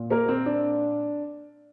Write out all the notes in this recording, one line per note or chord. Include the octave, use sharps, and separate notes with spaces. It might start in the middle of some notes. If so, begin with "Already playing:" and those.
Already playing: A#2
A#3 A#4
C4
D4